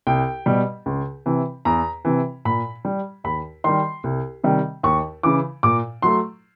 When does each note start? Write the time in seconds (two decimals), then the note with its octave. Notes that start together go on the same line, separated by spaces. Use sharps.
0.07 C2 G5
0.46 B2 G3
0.86 C#2
1.26 C3 E3
1.65 E2 A#5
2.05 C3 E3
2.45 A#2 B5
2.85 G3
3.24 D#2 B5
3.64 D#3 G3 C6
4.04 C2
4.44 C3 D#3 G3
4.83 D#2 C#6
5.23 C#3 E3 D6
5.63 A#2 D6
6.02 F#3 A3 C6